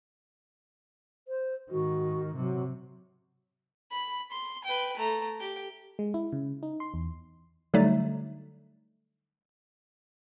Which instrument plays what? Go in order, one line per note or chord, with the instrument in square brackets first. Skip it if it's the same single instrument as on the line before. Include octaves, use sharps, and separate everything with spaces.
[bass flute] C5
[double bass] G#2 D#3 [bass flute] F#4
[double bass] C3 [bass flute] F#3
[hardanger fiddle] B5
C6
B4 G5
A3 A#5
G4 G5
[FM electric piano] G#3
E4
C#3
D#4
C6
E2
[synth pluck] D3 F#3 G3 A3 D#4